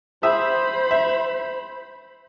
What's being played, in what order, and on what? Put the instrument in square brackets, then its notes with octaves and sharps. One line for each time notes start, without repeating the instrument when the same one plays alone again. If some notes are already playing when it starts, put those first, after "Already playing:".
[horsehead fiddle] C5 B5 [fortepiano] E5 D#6 E6
[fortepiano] E5